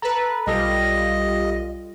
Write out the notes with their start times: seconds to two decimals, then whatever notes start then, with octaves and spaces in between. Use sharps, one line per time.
0.02 A4 B4 A#5
0.47 B1 G3 F4 A4 D#5